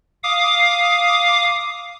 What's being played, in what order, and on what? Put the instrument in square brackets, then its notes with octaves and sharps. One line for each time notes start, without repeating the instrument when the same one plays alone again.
[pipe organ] F5 D6 D#6